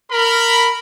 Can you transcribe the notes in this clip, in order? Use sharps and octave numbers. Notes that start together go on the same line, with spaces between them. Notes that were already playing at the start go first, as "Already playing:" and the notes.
A#4 B5